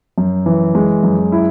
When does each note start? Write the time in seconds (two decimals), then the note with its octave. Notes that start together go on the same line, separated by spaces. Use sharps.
0.18 F#2
0.46 E3
0.75 G#3
1.03 F#2
1.32 E4